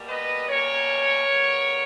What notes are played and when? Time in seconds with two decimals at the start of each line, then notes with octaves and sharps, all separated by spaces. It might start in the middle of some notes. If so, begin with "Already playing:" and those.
Already playing: B2 G3 A#3
0.08 B4 D#5
0.48 B2 G3 A#3 C#4 A#4 C#5
1.28 C#3 G3 B3